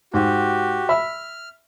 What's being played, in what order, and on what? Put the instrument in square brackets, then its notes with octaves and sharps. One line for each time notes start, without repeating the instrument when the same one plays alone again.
[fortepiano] G#2 [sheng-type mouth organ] F#4 G4
[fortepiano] E5 B5 [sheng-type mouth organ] F6